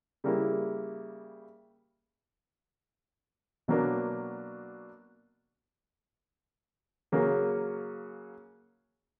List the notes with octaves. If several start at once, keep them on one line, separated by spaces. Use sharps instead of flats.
C#3 G3 A#3 E4
B2 F#3 A#3 D4
C#3 F#3 A#3 C#4